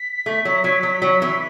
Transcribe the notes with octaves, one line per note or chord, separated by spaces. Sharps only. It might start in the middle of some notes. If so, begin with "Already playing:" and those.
Already playing: B6
A3
F#3
F#3
F#3
F#3
E3